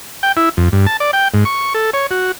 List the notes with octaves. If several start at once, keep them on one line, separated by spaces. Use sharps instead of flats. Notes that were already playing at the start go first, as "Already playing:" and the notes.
G5
E4
F2
G2
A5
D5
G5
G#2
C#6
A4
C#5
F#4